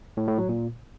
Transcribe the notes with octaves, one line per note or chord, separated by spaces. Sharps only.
A2
A2
F#3
A#2